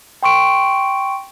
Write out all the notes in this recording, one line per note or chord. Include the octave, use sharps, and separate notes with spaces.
G5 C6 C#6 D7